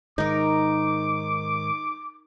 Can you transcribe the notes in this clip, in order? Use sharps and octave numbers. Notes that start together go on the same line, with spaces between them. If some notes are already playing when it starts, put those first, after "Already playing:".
G#2 D#3 D#4 A#4 D6